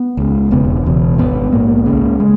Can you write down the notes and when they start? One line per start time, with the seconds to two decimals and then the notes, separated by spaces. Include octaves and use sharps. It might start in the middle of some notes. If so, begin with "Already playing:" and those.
Already playing: B3
0.17 C#2 C#3
0.51 E1 E2 C#3 B3
0.85 E1 E2 B2
1.18 G#1 G#2 B3
1.52 A#1 G#2 A#3
1.86 C#2 C#3
2.20 G#3